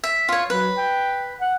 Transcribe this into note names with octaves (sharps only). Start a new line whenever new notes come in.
E5
F4 C#5
F#3 B4
G5
F#5